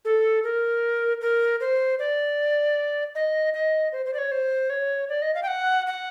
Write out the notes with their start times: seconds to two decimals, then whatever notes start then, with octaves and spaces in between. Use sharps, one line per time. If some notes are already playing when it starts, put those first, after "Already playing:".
0.05 A4
0.44 A#4
1.21 A#4
1.60 C5
1.99 D5
3.15 D#5
3.54 D#5
3.92 C5
4.06 C5
4.14 D5
4.18 C#5
4.32 C5
4.70 C#5
5.09 D5
5.22 D#5
5.35 F5
5.43 G5
5.48 F#5
5.87 F#5